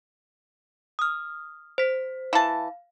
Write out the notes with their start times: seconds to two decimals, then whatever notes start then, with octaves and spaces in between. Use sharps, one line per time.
0.99 D#6 F6
1.78 C5 B6
2.33 E3 F5 A5